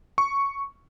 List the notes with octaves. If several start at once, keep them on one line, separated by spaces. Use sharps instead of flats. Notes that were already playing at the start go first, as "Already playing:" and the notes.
C#6